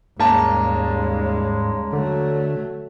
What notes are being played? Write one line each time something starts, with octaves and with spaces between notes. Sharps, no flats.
D#2 G#2 C#3 G3 G#3 A#3 A5
D3 F#3 A3